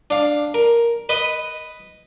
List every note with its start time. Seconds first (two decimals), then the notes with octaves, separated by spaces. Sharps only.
0.10 D4 F5
0.54 A#4
1.09 B4 D#5